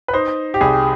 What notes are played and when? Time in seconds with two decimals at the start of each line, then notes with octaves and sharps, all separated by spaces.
0.08 B4
0.13 D#4 C5
0.54 G4
0.61 C2 G#4